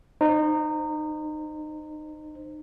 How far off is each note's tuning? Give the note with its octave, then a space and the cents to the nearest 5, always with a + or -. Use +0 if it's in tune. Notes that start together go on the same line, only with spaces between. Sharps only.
D#4 -25 C5 +0